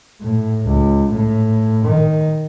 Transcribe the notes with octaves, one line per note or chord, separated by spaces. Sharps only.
A2
C#2
A2
D#3